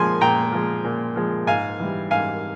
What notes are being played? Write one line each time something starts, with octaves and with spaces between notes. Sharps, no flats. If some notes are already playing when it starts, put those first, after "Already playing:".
Already playing: A#2 F3 G#3 G#5 C6
A#2 G5 A#5
F3 G#3
A#2
F3 G#3
G#2 F5 G#5
E3 G3
G#2 F5 G#5